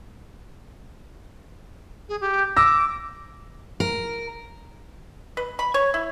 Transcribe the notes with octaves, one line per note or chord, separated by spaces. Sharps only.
G#4
G4
D6 E6 A#6
A#4
B4
B5
C#5
E4